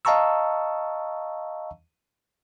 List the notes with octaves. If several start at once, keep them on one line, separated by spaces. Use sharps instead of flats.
D#5 F5 A5 A#5 C#6 E6